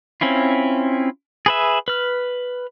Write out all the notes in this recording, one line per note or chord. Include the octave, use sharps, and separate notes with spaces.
C4 C#4 E4 F4
G#4 B4 E5
B4 F6